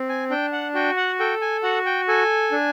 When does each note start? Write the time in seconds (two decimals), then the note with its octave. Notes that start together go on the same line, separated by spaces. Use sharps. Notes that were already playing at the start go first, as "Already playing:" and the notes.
Already playing: C4
0.09 G#5
0.30 D4 G5
0.52 F#5
0.74 F#4 G5
0.97 F#5
1.19 A4 G5
1.42 G#5
1.63 F#4 F#5
1.86 G5
2.08 A4 G#5
2.52 D4